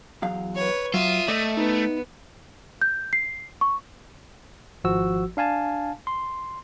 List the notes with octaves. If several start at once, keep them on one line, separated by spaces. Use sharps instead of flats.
E2 F#3 F5
B4 C#5
F#3 F4 E5 D#6
A3 D5 D#5
B3 D#4
G6
C7
C#6
G#1 F3 F#4 E6
D4 F5 G#5 A5
C6